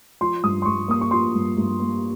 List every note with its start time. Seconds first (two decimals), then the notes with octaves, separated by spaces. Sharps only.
0.21 F3 C6
0.43 G2 D#6
0.62 C6
0.66 G2 C#6
0.88 A#3 D#6
1.01 C#6
1.11 F3 C6
1.34 G2
1.57 G2
1.80 A#3